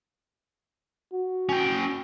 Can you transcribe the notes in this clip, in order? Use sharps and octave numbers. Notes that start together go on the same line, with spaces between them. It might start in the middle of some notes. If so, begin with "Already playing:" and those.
F#4
C#4 G5